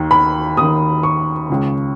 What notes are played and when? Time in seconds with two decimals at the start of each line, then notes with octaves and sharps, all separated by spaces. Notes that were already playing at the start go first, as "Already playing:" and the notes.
Already playing: D#2 D#3
0.11 B5
0.57 D#2 D#3 D#6
1.03 C#6
1.50 C#2 C#3